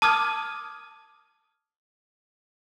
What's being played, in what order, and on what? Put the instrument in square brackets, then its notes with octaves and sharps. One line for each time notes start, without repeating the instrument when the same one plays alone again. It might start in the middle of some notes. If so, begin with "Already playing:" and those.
[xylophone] A5 D6 D#6 F6 G#6